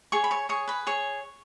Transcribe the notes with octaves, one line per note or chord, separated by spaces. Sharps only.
G#4 C#5 C#6
B5
C#5 C#6
G#4 C#5 C#6
B4 B5
G#4 C#5 C#6